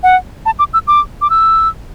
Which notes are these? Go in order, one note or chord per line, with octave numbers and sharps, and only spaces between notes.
F#5
A5
D6
E6
D6
D6
E6